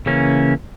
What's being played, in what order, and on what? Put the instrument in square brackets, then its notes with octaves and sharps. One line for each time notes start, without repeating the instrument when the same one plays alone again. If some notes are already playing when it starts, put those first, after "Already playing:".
[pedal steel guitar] C#3 E3 A#3 C#4